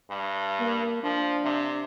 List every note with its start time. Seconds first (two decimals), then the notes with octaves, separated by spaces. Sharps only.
0.10 G2
0.60 A#3
1.03 F3 D4
1.44 C3